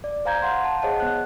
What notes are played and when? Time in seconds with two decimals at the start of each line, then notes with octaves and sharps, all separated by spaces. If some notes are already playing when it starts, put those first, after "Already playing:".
0.04 D5
0.25 C5 F5 G#5 A#5 G6 G#6
0.42 F5 F#5 C6
0.64 A5
0.82 G#4 C5 C#5 D#5 F#5 A5
1.00 B3 F#6